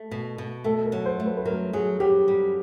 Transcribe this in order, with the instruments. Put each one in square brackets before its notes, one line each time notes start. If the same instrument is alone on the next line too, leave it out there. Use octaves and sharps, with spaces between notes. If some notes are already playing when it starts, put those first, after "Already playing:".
Already playing: [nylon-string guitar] A3
B2
B2
[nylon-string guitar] A3 [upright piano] A4
[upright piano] A#4
[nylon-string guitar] F#3
[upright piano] C5
[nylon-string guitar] A3
[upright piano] B4
B4
[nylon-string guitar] F#3 [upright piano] A#4
[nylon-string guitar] F#3 [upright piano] G#4
[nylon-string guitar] F#3 [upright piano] G4
[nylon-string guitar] G3